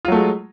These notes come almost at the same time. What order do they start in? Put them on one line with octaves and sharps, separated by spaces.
F4 F#3 A3 G#3